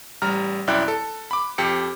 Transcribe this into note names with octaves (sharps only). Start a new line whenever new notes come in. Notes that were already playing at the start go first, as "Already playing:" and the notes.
A1 G3 A#5 F6
C2 F#2 E4 D5 G5 F#6
A4
B5 D6
F2 G4 C#7